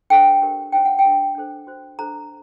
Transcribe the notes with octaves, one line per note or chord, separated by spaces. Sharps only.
D4 A4 C5 G5
D4 G4 A#4
D#4 F#4 C5 G5
F#5
G5
D4 F#4 A#4
D4 A4 C5
F#4 C5
D4 A4 C5 A#5